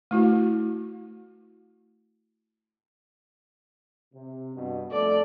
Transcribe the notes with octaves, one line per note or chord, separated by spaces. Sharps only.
A3 E4 F#4
C3
G2 B2
F2 A3 A4 D5